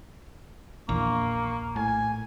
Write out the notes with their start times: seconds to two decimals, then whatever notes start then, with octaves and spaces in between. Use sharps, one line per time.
0.89 A#1 E2 A#3 C#6
1.76 A2 G#5